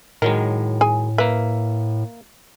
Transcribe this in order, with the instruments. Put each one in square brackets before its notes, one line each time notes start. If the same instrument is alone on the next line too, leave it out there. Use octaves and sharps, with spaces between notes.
[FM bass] A2 [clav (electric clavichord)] D#3 F#3 G#3 [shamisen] A#4
[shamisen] G#4 G#5
[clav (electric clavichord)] A#3 E5 [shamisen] B4